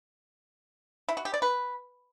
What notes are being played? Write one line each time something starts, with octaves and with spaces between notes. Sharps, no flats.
E4
F#4
G4
D5
B4